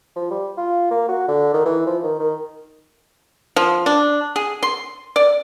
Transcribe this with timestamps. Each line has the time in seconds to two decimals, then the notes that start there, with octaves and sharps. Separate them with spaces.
0.16 F3
0.31 G3
0.57 F4
0.91 A#3
1.09 F#4
1.28 D3
1.54 D#3
1.65 E3
1.87 F3
2.03 D#3
2.20 D#3
3.56 F3
3.86 D4
4.36 G#4
4.63 C6
5.16 D5